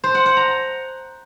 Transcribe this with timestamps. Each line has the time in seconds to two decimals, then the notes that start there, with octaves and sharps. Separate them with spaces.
0.04 C5
0.15 F#5
0.26 F#5
0.37 A#5